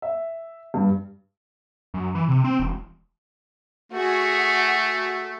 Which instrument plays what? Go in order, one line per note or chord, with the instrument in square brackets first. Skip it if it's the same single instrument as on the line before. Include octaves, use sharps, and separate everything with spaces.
[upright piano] E5
G2
[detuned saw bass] F#2
E3
C3
C4
E1
[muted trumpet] A3 [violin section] F#4 G#4